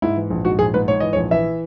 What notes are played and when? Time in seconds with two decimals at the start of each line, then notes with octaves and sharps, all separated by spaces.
0.02 G#2 E4
0.17 E3
0.30 A#1
0.45 G#2 F#4
0.59 A#1 G#4
0.74 G#2 B4
0.88 G#2 C#5
1.00 E3 D#5
1.13 C#5
1.16 A#1
1.31 E3 E5